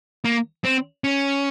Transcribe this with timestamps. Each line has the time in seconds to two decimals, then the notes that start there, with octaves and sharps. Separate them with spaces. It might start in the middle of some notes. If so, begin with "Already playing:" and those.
0.25 A#3
0.64 C4
1.04 C#4